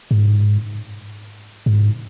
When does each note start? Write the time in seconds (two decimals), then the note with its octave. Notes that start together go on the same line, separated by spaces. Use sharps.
0.11 G#2
1.66 G#2